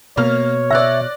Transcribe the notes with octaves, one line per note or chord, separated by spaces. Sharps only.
B2 A#3 C#5 F6
D5 E5 F#6 A#6